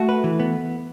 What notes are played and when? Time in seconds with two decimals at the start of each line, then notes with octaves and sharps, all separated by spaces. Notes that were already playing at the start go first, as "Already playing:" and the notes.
Already playing: A3 F#4
0.09 B4
0.24 E3
0.40 B3